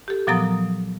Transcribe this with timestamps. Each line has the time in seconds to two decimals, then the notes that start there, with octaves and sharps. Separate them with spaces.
0.08 G4 A4
0.27 A#2 F3 F#3 B3 A#5 D#6